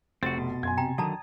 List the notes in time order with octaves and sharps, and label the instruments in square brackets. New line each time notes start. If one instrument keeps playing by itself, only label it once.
[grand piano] F1 A6 [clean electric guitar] C4 F#4 [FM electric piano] C6
[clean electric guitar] B2
[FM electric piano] F#2 [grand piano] G#5 C6 G#6
[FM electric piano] C3 [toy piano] G5 A#5
[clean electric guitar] D3 D#3 F#3 [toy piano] D5 A5 A#5 [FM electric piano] D#6